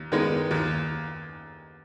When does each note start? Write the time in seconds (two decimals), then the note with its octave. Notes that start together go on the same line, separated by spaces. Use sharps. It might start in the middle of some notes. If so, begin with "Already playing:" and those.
Already playing: D#2
0.12 D#3 G#3 B3
0.51 D#2